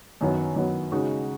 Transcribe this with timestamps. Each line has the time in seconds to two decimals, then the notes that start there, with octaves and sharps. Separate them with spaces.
0.21 F#2 D#3 F#3 B3
0.56 F#2 D#3 F#3 B3
0.92 C#3 G#3 D#4 F#4